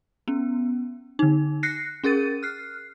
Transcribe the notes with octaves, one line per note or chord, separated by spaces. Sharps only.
B3 C#4
D3 D#4
F#6 A#6 C7 C#7
C#4 G#4 A#4 A6 D#7
F6 F#6 C7